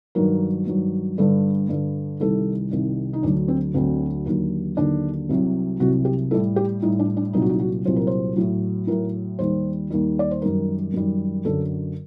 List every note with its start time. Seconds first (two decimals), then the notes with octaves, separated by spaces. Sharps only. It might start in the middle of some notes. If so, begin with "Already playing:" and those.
0.15 G2 D#3 F#3 A#4
0.67 G2 D#3 F#3
1.18 G2 D3 G3 A4
1.69 G2 D3 G3
2.20 C2 C3 D#3 G3 A4
2.71 C2 C3 D#3 G3
3.13 D#4
3.23 D2 D3 F#3 D4
3.48 C4
3.74 D2 D3 F#3 C4
4.26 D#2 D3 F#3
4.77 D#2 D3 F#3 D4
5.29 C2 C3 F#3
5.80 C2 C3 F#3 F#4
6.05 G4
6.31 A2 G3 A4
6.56 G4
6.82 A2 G3 D#4
6.99 D4
7.17 D4
7.33 C2 A#2 F#3 D#4
7.42 F#4
7.49 D#4
7.60 F#4
7.85 C2 A#2 F#3 C5
7.96 A#4
8.07 C5
8.36 A2 F#3
8.87 A2 F#3 A#4
9.38 D#2 D#3 G3 C5
9.90 D#2 D#3 G3
10.19 D5
10.31 C5
10.42 F#2 D#3 G3 A#4
10.94 F#2 D#3 G3
11.45 F#2 D3 F#3 A4